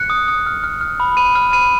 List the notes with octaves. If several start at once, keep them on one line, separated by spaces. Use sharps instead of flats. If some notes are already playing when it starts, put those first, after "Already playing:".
Already playing: F#6 C#7
D#6
D#6
F6
F6
F6
B5
B5 D#7
F6
B5 D#7